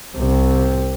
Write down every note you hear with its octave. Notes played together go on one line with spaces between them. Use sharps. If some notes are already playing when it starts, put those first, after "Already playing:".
C2 C3